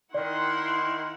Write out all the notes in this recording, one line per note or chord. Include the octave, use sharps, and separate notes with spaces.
D#3 E4 D5 F#5 C6